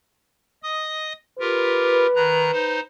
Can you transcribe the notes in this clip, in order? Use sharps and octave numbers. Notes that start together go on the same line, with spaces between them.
D#5 D#6
F4 G4 A#4 B4
D#3 A#5 F#6
D#4 C5